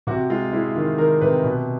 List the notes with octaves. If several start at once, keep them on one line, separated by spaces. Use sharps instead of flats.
C3 F#4
G#3 F4
G#3 E4
D#3 F4
D#3 A#4
C3 B4
B2